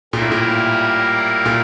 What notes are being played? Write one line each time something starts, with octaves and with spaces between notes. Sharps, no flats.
A#2 G3 A#3 E4 A#4
A2
A#2
A#2